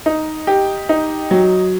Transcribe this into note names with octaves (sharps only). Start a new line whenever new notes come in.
D#4
G4
D#4
F#3